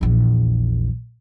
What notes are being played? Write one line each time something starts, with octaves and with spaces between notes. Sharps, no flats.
A#1 E2